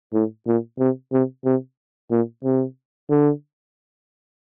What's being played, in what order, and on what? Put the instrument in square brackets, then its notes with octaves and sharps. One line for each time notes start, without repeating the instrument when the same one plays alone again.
[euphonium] A2
A#2
C3
C3
C3
A#2
C3
D3